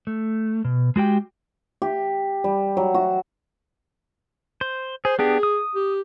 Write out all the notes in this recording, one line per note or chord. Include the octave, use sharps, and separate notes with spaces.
A3
B2
G#3 F#4 G4 G5
G4
G3
F#3
F#4
C5
G#4 C5
B3 D4 G4 G#4
D#6
G4